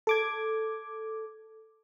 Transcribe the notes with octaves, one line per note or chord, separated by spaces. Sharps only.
A4 D6 G#6